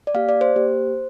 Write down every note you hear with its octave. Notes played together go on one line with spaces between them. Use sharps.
D5
A#3 G4 F5
D5
C5
A#3 G4